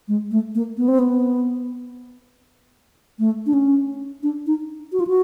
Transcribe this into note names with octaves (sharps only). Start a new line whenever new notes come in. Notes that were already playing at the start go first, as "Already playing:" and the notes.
G#3
A3
A#3
B3
C4
B3
A3
D4
C#4
D4
D#4
F#4
F4
F#4